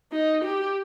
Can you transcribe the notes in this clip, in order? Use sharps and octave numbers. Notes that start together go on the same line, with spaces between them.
D#4
G4